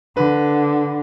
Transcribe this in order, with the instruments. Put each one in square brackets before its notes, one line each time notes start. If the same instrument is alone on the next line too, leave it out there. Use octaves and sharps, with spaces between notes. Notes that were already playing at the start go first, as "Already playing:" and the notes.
[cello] D3 [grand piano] B4